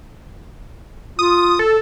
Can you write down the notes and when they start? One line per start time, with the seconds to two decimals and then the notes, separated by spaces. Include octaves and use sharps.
1.19 F4 D#6
1.59 A4